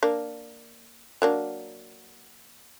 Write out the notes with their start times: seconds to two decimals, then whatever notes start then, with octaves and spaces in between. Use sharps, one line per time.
0.03 A#3 D4
1.22 F#3 A#3 D4